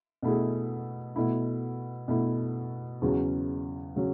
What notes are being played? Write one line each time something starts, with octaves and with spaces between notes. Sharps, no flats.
B2 A3 E4 G#4
B2 A3 E4
B2 A3 E4
E2 C#3 F#3 C#4
C#3 F#3 C#4